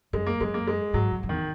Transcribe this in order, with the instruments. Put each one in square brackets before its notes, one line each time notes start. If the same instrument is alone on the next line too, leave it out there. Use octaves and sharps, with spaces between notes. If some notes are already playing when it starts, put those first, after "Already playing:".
[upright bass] F#2 [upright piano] G#3
[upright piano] A#3
[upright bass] F#2 [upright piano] G#3
[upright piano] A#3
G#3
[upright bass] G#2 [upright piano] F#3
[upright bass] F#2
F#2
[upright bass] E2 [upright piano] D#3